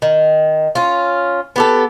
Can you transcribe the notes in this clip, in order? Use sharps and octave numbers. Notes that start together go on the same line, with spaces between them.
D#3
C#4 F4
B3 G4 A4